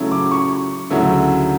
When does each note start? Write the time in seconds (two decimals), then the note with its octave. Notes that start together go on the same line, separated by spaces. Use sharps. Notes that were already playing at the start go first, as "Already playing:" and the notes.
Already playing: C#3 F#3 A3 C#4 E4
0.12 D6
0.31 C#6
0.90 D2 C#3 F#3 A3 E4